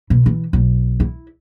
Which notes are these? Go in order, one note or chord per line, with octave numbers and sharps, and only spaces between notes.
B2
E3
B1
E4